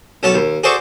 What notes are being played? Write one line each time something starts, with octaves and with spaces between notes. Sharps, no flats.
B1 C#4 A4 F#5 A5
D#2
F#4 G#4 A4 C5 D5 C#6